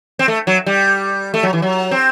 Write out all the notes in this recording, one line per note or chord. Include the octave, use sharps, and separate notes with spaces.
C4
A3
F#3
G3
A3
F#3
E3
F#3
C4